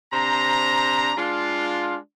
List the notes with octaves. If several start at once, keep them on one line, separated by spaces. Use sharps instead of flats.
C3 D4 C5 A#5
G#3 D4 F4